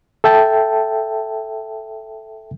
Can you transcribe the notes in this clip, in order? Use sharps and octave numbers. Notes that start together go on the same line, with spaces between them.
A4 E5 G5 A5